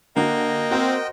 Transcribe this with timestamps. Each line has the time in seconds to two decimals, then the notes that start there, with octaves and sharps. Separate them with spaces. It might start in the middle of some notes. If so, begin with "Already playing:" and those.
0.16 D3 A#3 D4 F#4 D#5 G5
0.71 C4 F#4 A#4 C5